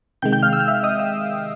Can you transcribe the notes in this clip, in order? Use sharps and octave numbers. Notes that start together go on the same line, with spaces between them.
C3 D#3 G#3 G5 G6
G5 G6
F5 F6
E6
F6
E5 E6
D#5 D#6
E5 E6